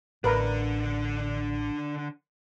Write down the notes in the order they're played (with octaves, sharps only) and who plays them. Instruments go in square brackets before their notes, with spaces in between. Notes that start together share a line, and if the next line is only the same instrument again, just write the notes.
[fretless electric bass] A1 [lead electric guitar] D3 D4 [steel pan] A#4 B4 A#5